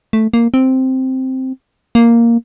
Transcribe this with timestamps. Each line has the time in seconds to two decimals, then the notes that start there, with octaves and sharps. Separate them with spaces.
0.13 A3
0.34 A#3
0.54 C4
1.95 A#3